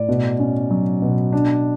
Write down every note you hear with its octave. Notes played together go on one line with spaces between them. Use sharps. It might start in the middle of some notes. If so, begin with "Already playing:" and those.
Already playing: A2 D5
B2
C#4
F#3
B2
D4